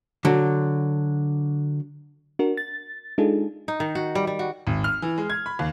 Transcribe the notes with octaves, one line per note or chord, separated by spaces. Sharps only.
D3 F#3
D4 F#4 A#4
A6
G#3 D4 D#4 F4 G#4 A4
D#4
D#3
F#4
G3
G3
F#4
G#1
F6
E3
G#3
G#6
B5
D#2